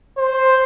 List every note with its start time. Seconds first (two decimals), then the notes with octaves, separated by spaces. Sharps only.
0.18 C5